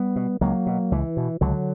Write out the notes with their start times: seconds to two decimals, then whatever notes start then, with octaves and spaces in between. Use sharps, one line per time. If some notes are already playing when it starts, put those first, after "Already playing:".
Already playing: G3 B3
0.16 B2
0.41 C#2 F#3 A#3
0.66 B2
0.92 C#2 E3
1.17 B2
1.41 C#2 D3 F#3